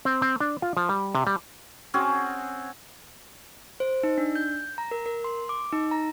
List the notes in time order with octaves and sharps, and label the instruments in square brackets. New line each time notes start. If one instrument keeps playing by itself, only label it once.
[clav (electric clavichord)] C4
C4
D4
F4
F3
G3
C3
G3
[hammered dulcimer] C4 C#4 F#4 G#4
[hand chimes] C5
D#4
D4
G6
A#5
A#4
A#4
C6
D6
D#4
A#5